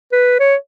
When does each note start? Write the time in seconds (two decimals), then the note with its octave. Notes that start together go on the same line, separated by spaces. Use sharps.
0.12 B4
0.40 C#5